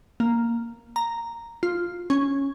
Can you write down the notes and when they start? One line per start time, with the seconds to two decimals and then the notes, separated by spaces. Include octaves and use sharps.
0.20 A#3
0.96 A#5
1.63 F4
2.10 C#4